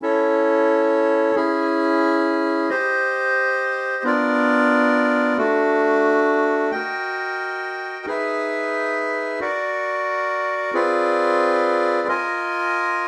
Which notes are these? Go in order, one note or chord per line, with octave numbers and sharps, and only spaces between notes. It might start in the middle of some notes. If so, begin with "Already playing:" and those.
C#4 E4 A4 C#5
C#4 E4 G#4
G4 C5 D#5
B3 D4 F4 A#4 D5
A3 D4 F#4
F#4 A#4 D#5 G5
D#4 G#4 B4 E5
F#4 A#4 D5 F#5
C4 F4 G#4 B4 D5
F4 A#4 D#5 G#5